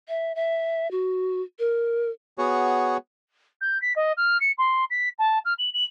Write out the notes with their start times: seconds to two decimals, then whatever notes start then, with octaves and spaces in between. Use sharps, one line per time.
0.08 E5
0.36 E5
0.91 F#4
1.59 A#4
2.38 B3 F#4 G#4 C#5
3.61 G6
3.82 B6
3.96 D#5
4.17 F6
4.40 C#7
4.58 C6
4.90 B6
5.19 A5
5.45 F6
5.58 F#7
5.73 F#7